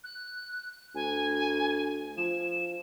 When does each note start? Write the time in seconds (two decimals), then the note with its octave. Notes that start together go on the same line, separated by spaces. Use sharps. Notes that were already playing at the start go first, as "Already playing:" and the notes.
0.04 F#6
0.95 D2 G#5
2.17 F3 E7